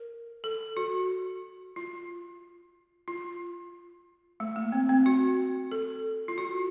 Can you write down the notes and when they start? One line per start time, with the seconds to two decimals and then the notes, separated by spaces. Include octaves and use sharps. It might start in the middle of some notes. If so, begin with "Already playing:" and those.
Already playing: A#4
0.44 A4
0.77 F#4
1.76 F4
3.08 F4
4.40 A3
4.56 A#3
4.72 C4
4.89 C4
5.06 F#4
5.71 A4
6.28 F4
6.38 F#4